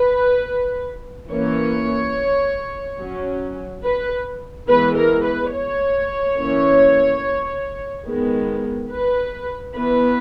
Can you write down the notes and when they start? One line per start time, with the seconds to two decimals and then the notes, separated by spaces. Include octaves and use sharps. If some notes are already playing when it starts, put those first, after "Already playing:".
Already playing: B4
1.30 E3 A#3 C#4 C#5
3.00 F#3 C#4
3.83 B4
4.68 E3 G#3 B3 B4
4.96 A#4
5.24 B4
5.53 C#5
6.37 E3 A#3 C#4
8.06 D#3 G#3 B3
8.90 B4
9.75 E3 B3 B4